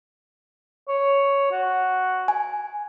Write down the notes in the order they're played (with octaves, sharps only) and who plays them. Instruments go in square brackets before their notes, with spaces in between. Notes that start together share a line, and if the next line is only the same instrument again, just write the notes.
[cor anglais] C#5
F#4
[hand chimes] G#5